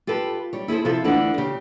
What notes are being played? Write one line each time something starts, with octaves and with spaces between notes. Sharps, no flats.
F4 G4 A4 B4
G3 C#5
E4 G#4 A4 C5
C3 F3 E4 F4 A4
D2 D3 E3 F#5
C#3 G4